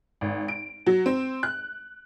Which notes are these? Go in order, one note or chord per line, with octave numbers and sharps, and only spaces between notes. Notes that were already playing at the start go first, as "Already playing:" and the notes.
G#1
D7
F#3
C4
F#6